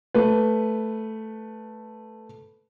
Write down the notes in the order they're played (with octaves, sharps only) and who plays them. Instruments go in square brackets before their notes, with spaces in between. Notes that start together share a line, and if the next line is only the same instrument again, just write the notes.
[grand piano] A3 B4